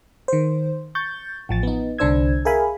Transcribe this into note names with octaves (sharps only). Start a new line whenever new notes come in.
D#3 C5
C#6 G6 A6
A1 F3 A6
B3 D#4
C2 D3 D4 C5 E6 G#6
G#4 A#4 E5 F5 G#5 B5